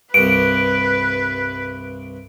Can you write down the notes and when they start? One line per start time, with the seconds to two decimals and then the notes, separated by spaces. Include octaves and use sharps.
0.14 C2 G2 B4 D7